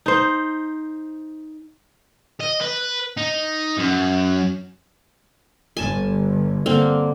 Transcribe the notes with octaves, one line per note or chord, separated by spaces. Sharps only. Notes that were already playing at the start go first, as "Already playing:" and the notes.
D#4 C5
D#5
B4
D#4
F#2
G1 G#5 A5
D3 A#3 C4